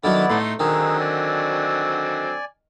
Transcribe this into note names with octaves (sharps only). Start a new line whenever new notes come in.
D3 D#3 F#3 B3 E4 D5
A2 A3 D#4 C6
D3 D#3 F#3 C4 D#4 G#4
D5 G#5